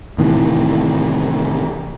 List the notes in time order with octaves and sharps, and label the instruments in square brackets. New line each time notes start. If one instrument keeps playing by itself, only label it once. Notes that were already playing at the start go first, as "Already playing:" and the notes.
[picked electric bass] A2 C3 D#3 E3